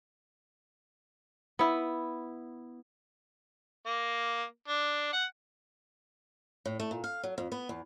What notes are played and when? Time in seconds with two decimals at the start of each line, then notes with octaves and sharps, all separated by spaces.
1.59 B3 E4
3.86 A#3
4.68 D4
5.13 F#5
6.65 A2
6.80 A3
6.91 A#2
7.04 F5
7.23 F#3
7.38 F2
7.52 B3
7.69 E2